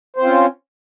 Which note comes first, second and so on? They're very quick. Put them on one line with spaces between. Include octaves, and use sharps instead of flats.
C5 C4 F4 C#4